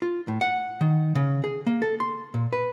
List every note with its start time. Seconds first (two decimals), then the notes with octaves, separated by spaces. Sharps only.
0.02 F4
0.28 A2
0.41 F#5
0.81 D#3
1.15 C#3
1.44 G#4
1.67 A#3
1.82 A4
2.00 C6
2.34 A#2
2.53 B4